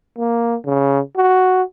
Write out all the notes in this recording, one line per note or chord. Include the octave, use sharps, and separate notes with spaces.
A#3
C#3
F#4